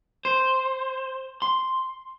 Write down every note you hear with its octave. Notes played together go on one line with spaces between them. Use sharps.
C5
C6